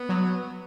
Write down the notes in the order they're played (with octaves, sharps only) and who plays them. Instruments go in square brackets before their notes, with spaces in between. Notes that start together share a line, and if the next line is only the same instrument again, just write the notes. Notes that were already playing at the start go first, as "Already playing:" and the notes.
Already playing: [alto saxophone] B3
[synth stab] F#3